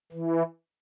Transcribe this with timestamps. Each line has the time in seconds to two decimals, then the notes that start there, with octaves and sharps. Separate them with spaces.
0.12 E3